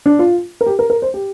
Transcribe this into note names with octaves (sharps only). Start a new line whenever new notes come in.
D4
F4
A#4
G4
A#4
A#4
C5
G4